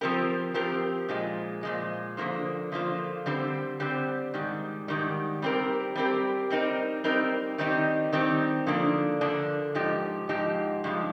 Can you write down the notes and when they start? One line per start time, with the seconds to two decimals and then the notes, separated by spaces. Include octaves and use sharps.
0.01 F3 C4 G4 A#4
0.54 F3 C4 G4 A#4
1.09 A#2 F3 G#3
1.63 A#2 F3 G#3
2.17 D3 F3 A#3 F4 C5
2.72 D3 F3 A#3 F4 C5
3.26 D3 G3 C4 G4 C5
3.80 D3 G3 C4 G4 C5
4.34 G#2 D#3 G3
4.88 G#2 D#3 G3
5.42 G3 C4 G4 A#4
5.96 G3 C4 G4 A#4
6.50 G3 C4 D#4 A#4
7.04 G3 C4 D#4 A#4
7.58 D#3 G3 C4 D#4 G4
8.13 D#3 G3 C4 D#4 G4
8.67 D3 F3 A#3 D4
9.21 D3 F3 A#3 D4
9.75 G#2 F3 D#4 G4
10.29 G#2 F3 D#4 G4
10.84 G2 F3 G#3